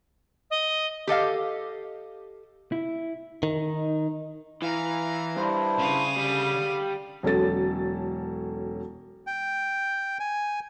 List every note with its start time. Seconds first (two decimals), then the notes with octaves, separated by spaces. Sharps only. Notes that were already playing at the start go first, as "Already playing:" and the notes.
0.50 D#5
1.07 G4 A4 D#5 F5
2.72 E4
3.43 D#3 D#4
4.62 E3 F5 A#5
5.36 G2 D4 E4 C5
5.79 C#3 F5 D#6
6.16 D3 G3
7.23 E1 F#3 C#4 A4 A6
9.27 G5
10.20 G#5